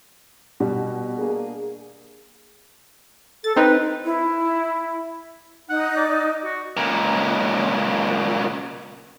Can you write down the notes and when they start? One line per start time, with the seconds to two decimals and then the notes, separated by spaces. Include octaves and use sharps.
0.60 B2 G3
1.17 A#3 D4 G#4
3.44 A4 A6
3.56 C4 D#4 B4
4.05 E4
5.69 D#4 F#5
5.96 D5
6.44 F#4
6.77 C#2 A#2